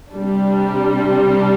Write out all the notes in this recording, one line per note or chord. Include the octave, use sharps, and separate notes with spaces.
C3 G3 D4